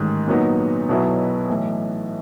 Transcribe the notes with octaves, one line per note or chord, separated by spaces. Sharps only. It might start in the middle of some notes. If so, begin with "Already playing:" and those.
Already playing: A1 G#2 D#3
A#2 F#3 B3 D#4
B1 B2 F#3 B3 E4
B1 A2 E3